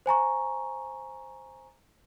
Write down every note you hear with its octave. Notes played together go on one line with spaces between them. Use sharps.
C5 G#5 A#5 C#6